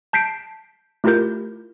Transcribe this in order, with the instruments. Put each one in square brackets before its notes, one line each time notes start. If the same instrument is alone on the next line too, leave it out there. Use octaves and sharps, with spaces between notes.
[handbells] A5 G6 B6 C7 D7
A3 E4 F4 G4 A#4 G6